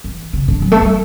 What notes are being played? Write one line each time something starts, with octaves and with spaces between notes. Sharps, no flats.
E3
C#3
D3
F#3
A3
G3